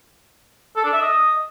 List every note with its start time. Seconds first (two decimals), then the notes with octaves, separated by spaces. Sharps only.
0.76 A4
0.84 D4
0.93 E5
1.01 D#5